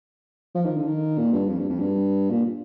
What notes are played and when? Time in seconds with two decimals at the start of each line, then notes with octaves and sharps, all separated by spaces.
0.55 F3
0.65 D#3
0.77 D3
0.87 D#3
1.18 A#2
1.33 G2
1.49 F2
1.59 G2
1.70 F2
1.79 G2
2.31 A#2